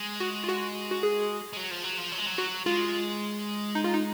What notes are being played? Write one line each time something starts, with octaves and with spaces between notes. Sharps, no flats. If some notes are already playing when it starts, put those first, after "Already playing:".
Already playing: G#3
F#4
F4
F#4
F#4
G#4
G#3
F#3
F3
F#3
F3
F#3
G#3
F#3
F#4
G#3 F4
D#4
F4
D#4